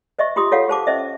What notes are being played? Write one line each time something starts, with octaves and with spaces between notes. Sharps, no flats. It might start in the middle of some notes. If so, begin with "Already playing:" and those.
C5 D#5 E5 C#6
F4 G4 C6 D#6
F4 A4 C#5 F5 F#5
G4 C5 A5 D6
C#4 C5 D#5 E5